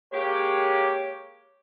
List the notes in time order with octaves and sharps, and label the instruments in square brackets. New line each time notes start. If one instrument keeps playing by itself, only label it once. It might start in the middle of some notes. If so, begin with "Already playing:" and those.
[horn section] G#3 A#3 G4 [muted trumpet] C#5